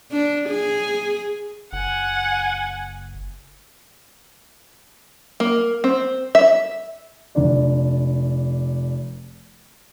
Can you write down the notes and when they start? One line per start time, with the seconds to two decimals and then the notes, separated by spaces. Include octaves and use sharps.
0.11 D4
0.49 G#4
1.73 F#1 F#5 G#5
5.40 A#3
5.84 C4
6.35 E5
7.35 F1 D4 D5